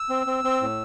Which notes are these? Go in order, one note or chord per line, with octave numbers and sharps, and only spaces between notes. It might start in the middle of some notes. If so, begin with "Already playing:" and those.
Already playing: E6
C4
C4
C4
A2